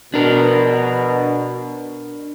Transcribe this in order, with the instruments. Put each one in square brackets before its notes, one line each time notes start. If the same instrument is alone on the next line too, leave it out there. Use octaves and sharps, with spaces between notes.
[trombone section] B2 [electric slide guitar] D4 A#4